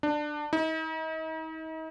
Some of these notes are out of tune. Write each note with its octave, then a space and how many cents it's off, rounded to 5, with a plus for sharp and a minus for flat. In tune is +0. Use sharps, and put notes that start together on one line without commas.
D4 +20
D#4 +40